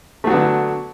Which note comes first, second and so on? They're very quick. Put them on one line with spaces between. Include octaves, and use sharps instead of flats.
A3 F#3 B3 D3